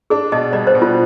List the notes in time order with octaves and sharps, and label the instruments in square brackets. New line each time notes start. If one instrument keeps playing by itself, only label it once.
[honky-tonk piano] D4 [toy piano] G#4
[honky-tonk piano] B2 [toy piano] D#5
[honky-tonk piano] G3 [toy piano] D5
[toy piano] C5
[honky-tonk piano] B2
[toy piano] F4